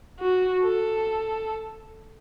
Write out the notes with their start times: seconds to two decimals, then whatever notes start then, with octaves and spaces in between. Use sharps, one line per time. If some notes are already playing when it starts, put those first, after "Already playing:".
0.20 F#4
0.63 A4